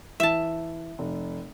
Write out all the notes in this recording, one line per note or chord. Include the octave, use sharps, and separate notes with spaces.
E3 E5 A5
F1